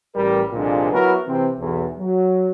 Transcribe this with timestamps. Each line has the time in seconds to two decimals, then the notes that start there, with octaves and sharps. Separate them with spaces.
0.15 A1 G3 G4 A#4
0.53 C2 A#2 D3 F3 G#3
0.92 F#3 B3 E4 F#4 A#4
1.27 C3 E3 C4
1.59 B1 E2
1.98 F#3